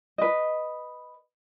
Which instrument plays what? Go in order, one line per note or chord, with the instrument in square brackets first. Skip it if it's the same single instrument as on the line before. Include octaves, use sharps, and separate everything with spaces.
[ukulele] B4 D#5